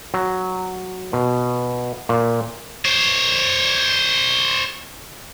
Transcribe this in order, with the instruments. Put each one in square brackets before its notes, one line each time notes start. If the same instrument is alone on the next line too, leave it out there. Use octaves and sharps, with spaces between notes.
[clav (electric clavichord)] F#3
B2
A#2
[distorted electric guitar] C5 C#5